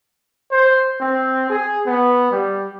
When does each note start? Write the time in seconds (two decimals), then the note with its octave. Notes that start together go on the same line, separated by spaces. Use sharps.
0.52 C5
1.01 C4
1.50 G#4
1.87 B3
2.31 G3